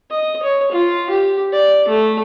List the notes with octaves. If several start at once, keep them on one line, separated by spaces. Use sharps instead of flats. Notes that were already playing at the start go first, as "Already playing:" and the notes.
D#5
C#5
F4
G4
D5
A3